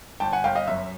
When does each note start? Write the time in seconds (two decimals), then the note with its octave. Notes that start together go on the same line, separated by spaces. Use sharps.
0.20 G1 G5 A5
0.32 F#5 G#5
0.44 G1 F5 G5
0.55 D#5 F5
0.67 F#2 E5